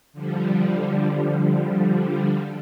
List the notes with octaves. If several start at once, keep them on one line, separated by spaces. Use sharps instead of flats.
D3 F3 G3